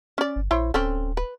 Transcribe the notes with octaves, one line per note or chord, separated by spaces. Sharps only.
C#4 D5
G1
A#1 E4 C5 C#5
D1 C4 C#4 A4
B4